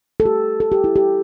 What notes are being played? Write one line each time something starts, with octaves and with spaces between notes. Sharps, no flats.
A4
G4
A4
G4
E4
G4